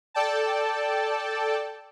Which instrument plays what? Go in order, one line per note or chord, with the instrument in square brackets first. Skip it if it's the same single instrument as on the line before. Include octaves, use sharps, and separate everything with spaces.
[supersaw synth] A4 D5 G5 A5